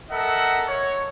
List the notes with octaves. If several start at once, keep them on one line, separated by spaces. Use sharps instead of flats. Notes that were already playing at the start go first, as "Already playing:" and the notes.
A4 A#4 D#5 E5 F#5
C#5